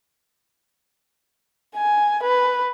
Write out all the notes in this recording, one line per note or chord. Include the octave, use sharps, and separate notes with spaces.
G#5
B4